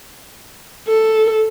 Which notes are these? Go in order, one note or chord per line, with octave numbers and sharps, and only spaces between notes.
A4